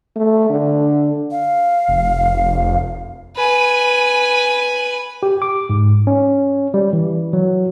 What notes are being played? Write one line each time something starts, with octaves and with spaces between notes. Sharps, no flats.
A3
D3
F5
F1
B4 G#5
G4
D6
G#2
C#4
G3
E3
F#3